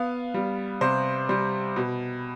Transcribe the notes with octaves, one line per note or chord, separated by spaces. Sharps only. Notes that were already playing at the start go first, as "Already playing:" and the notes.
Already playing: B3 F5
G3
C3 C5
G3 C5
B2